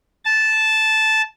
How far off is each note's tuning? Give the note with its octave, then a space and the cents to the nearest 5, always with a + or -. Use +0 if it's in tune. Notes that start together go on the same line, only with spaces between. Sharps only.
A5 -10